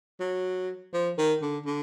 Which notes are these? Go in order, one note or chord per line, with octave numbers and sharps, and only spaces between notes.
F#3
F3
D#3
D3
D3